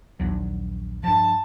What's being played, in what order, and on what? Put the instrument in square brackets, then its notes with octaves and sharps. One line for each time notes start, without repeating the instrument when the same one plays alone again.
[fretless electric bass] A#1 D#2 F#3
[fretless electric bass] G2 F3 [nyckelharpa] A5